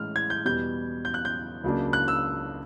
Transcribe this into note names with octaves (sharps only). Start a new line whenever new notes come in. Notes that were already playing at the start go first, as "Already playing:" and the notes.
Already playing: A2 E3 G#3 C#4 F6
G#6
G6
E2 B2 G3 G6
G6
F#6
G6
C#2 C#3 F#3 A#3 D4
F#6
E6